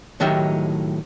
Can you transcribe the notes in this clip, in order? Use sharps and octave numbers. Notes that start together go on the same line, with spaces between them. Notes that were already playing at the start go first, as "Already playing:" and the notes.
A2 D#3 F#3 D#4 G4 E5